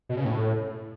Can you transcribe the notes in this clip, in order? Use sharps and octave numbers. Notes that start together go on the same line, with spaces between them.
B2
C#3
A2